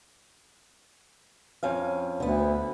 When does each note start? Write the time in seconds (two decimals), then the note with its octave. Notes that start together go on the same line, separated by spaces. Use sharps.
1.63 F2 C#4 F5
2.20 D2 D3 B3